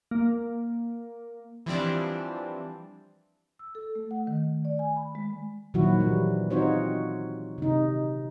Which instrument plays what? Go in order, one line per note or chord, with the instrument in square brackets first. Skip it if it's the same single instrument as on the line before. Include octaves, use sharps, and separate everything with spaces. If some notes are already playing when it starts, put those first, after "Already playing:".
[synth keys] A#3
E3 F3 G3 C4 D4
[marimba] E6
A4
A3
F#5
D#3
A3
D5
G#5
B5
G#3
[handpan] A#2 D#3 F3 F#3 E4 F#4
E3 G3
C4 D#4 F4 F#4 C5 C#5
C3 D#4